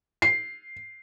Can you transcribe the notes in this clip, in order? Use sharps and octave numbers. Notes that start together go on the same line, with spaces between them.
C7